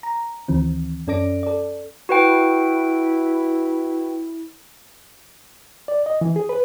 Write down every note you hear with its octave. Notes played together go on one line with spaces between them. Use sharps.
A#5
D2 D#3 E3 C4
F#2 C#4 A4 D5 A#6 D7
A4 D5
E4 F#4 B4 G5
D5
D#5
E3
G#4
B4